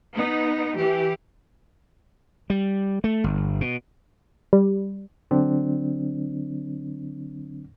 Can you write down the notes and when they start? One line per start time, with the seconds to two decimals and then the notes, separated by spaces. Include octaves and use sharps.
0.11 B3 D#4
0.76 E3 G4
2.50 G3
3.04 A3
3.24 G1
3.61 B2
4.53 G3
5.31 D3 F#3 C4 D4